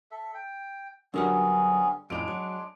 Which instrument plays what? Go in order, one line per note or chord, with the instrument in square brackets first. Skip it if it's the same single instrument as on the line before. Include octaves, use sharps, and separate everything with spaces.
[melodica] A4 E5
G5
[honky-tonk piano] D3 G3 [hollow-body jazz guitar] F#3 A#4 F#5 [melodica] B3 C#4 G#4
[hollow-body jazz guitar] F2 A2 [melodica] G#3 D4 [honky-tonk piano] D7 F7
[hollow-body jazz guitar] F#3